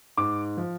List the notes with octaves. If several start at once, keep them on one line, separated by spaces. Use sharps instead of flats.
G#2 D6
F3